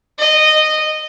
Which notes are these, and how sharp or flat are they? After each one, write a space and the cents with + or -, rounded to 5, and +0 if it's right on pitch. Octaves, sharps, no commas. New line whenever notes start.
D#5 -15